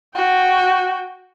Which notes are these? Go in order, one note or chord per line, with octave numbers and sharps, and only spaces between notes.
F#4 G5